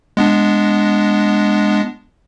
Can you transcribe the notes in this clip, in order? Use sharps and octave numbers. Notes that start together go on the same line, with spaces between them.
G#3 B3 D4